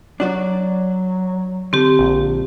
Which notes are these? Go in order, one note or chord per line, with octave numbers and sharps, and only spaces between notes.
F#3 D4 F#4 D5
D3 C4 G4
A#1